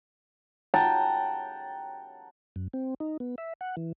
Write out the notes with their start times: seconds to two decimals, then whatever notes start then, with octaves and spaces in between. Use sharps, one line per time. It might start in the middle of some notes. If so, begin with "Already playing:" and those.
0.74 F#5 G5 A5 A#5
2.56 F#2
2.73 C4
3.00 D#4
3.20 B3
3.38 E5
3.61 F#5
3.77 E3